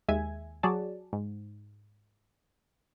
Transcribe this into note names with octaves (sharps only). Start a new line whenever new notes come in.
D#2 G#3 E5 G#5 G#6
F#3 F#4 G#4 D5 A5
G#2